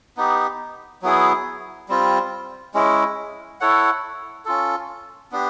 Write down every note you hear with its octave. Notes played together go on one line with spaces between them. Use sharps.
B3 D#4 G4
F#3 B3 E4 G#4
G3 C4 F4
G#3 C#4 E4
E4 A4 C#5 F#5
C#4 F4 A4
B3 D4 G4